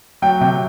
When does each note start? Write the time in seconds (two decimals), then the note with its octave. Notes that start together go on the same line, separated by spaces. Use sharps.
0.22 F#3 G5
0.41 C3 G5